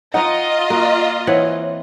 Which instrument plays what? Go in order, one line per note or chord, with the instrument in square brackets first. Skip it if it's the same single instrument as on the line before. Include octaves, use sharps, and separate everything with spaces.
[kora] D#4 [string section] F4 D#5 [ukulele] F#5 A#5
[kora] A#3 F#4
[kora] E3 C4 F#5 [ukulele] C#5